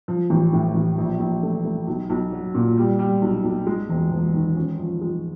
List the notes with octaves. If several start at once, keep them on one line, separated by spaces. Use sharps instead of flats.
F3
A1
A2
A1
A#1
A#1
A3
A3
B1
B1
F#3
A#2
G3
G3
B1
B1
G#3
E1
E1
D#3
C#4
F3
G#3